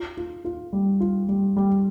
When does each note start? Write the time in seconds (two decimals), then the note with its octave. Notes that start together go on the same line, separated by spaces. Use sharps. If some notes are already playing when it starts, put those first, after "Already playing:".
Already playing: F4
0.17 F4
0.45 F4
0.73 G3
1.00 F4
1.29 G3
1.56 G3